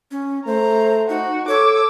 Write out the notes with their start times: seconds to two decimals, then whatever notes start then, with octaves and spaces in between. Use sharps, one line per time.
0.11 C#4
0.46 A3 C5 A#5
1.09 D#4 F#4
1.48 A4 C#5 D6 E6